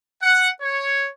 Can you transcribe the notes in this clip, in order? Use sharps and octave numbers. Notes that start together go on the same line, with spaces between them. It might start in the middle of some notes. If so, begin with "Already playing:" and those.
F#5
C#5